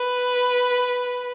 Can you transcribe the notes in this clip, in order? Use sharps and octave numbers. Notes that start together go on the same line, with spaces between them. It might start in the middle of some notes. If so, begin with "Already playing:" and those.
Already playing: B4